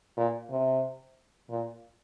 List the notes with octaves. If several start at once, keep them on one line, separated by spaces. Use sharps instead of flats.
A#2
C3
A#2